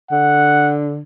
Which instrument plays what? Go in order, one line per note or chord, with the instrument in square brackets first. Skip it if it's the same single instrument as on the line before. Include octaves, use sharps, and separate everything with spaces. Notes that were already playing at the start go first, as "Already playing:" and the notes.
[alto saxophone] D3 [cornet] F#5